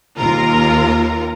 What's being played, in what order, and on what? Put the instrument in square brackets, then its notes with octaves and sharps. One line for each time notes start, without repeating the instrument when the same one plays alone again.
[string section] D#2 F4 A#4 A#5